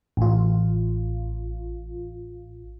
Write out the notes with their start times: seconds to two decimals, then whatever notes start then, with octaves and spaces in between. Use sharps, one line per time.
0.17 A1 F4